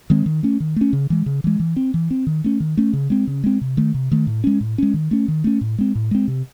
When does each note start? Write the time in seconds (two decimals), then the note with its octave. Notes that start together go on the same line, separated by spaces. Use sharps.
0.10 D#3 G#3 C4
0.26 D#3
0.43 A3 C#4
0.60 D#3
0.76 A3 C#4
0.93 C#3
1.10 E3 G#3
1.26 C#3
1.44 E3 G#3
1.60 E3
1.76 C4
1.94 E3
2.11 C4
2.27 D#3
2.44 A3 C#4
2.60 D#3
2.77 A3 C#4
2.93 C#3
3.10 G#3 C4
3.27 C#3
3.44 G#3 C4
3.61 C3
3.77 D#3 A3
3.94 C3
4.11 D#3 A3
4.27 A2
4.44 G#3 C#4
4.61 A2
4.78 G#3 C#4
4.94 D#3
5.11 A3 C#4
5.28 D#3
5.44 A3 C#4
5.61 A2
5.78 G#3 C4
5.95 A2
6.11 G#3 C4
6.28 C3